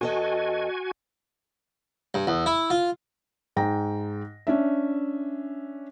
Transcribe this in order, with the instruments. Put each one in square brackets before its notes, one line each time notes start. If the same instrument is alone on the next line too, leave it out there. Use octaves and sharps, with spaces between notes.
[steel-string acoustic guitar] E2 A4 D#5 [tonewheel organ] F#4 G#5
[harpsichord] G2
E2
E4
F4
[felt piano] G#2 G5 A#6
C#4 D4 E5